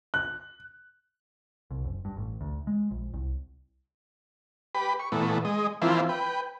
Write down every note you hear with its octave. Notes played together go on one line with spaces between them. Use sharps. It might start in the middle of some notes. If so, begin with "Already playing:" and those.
F#6
C2
F#1
G2
A1
D2
G#3
A#1
C2
G4 B4 B5
C#6
A#2 E3 A3 B3
G#3 D#5
E3 F3 A#3 C4 E4 F4
B4 G5